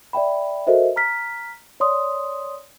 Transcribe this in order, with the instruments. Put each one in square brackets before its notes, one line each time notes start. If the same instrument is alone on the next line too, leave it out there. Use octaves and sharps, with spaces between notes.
[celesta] D5 E5 G5 B5
F#4 A4 A#4 C5 D#5 E5
A#5 F6 B6
C#5 D5 C6 D#6